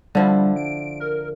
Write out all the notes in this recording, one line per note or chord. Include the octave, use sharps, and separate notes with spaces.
D3 F3 G3 E4
D7
A#4